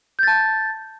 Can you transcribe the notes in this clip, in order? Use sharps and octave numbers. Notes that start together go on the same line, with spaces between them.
A5 G6 A6